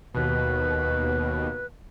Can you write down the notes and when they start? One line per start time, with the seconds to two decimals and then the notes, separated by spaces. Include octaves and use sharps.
0.14 D#2 B2 B4